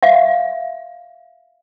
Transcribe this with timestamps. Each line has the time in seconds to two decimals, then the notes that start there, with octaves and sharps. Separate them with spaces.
0.03 E5 F5